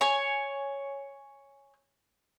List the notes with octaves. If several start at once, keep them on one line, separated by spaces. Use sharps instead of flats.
C#5 G#5